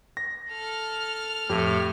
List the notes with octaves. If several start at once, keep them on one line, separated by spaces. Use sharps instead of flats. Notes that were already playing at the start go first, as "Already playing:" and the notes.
A#6
A4 F6
F2 A2 G4